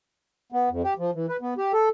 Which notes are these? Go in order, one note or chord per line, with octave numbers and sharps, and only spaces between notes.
B3
F2
G4
F3
E3
B4
B3
G4
A4